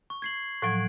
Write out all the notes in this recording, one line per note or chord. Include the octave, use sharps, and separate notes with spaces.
C#6
G#6 C7 F#7
A2 F3 F#3 F#6 G#6 D7